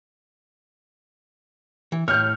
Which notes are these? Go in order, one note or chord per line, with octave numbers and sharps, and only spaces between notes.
E3
A2 C#5 F6 G6